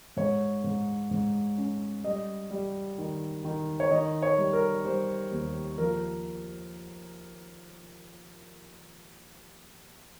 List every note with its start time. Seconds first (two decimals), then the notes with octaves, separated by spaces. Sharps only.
0.17 G#2 C#5
0.64 G#2
1.11 G#2
1.58 C#4
2.04 G3 D#5
2.51 G3
2.98 D#3
3.45 D#3
3.80 C#5
3.91 D#3 D#5
4.22 C#5
4.38 G3
4.53 A#4
4.85 G3 C5
5.32 D#2
5.78 F3 A#4